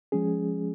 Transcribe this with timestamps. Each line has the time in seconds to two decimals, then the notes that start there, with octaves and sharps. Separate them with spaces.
0.12 F3 G#3 C#4 G#4